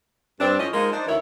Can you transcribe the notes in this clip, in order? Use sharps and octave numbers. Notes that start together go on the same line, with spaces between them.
G2 C4 D4
A2 F3 C#4 D#5
F3 G#3 A#3 D#4 A#4
D4 D#4 C5
D2 D#3 E3 E4 A#4 C#5